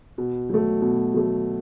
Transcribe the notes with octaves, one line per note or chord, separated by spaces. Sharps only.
B2
F#3 A3
B2
F#3 A3